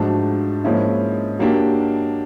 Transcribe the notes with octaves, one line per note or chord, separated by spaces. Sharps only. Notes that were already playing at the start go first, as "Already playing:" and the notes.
Already playing: G#2 F3 A3 D4 F#4
G#2 F3 A#3 C#4 E4
F#3 A#3 D4 G4